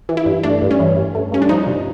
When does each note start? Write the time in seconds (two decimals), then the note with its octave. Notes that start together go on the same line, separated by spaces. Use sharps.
0.09 E3
0.17 E4
0.26 G2
0.43 A3 D4
0.62 G2
0.71 C#4
0.80 E3
0.96 G2
1.15 A3
1.32 G2 C#4
1.42 D4
1.49 F3 D#4
1.67 C3